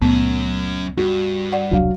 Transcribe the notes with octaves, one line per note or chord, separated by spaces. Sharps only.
C#2 F#2 A#2 A3 B3 C#4
G2 F#4
D5 F#5
E1 C2 F#3 D4 F5